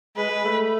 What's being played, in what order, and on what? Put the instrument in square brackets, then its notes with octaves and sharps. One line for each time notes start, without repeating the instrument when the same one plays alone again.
[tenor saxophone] G#3 [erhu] B4
[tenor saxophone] G#3
A3